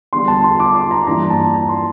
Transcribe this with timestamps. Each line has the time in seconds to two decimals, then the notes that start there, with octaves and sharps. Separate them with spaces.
0.13 E2 D3 G3 C6
0.28 A5
0.44 C6
0.60 D6
0.76 C6
0.91 A#5
1.07 G2 E3 A#3 E4 A#5
1.30 A5
1.54 A#5
1.69 C6